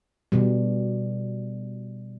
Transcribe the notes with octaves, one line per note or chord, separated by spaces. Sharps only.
B2 G3